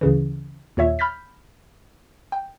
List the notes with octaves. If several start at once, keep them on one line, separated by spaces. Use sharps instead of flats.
D2 C#3 E3
D#2 A#2 C#5 E5
B5 F6 G6 A6 B6
G5